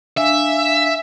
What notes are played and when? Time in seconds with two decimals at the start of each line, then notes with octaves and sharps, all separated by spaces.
0.17 D4 E5 F5 G#5